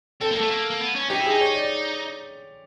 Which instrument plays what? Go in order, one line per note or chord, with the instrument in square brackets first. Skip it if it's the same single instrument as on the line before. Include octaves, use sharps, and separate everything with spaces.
[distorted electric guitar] C4 [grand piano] A4
[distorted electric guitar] A#3 [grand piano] A4
[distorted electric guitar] A3
A#3
A#3
B3
C#4
[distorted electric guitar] D#4 [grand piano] G4
[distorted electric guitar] E4
[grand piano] G#4
[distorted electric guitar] D#4
[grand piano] C#5
D5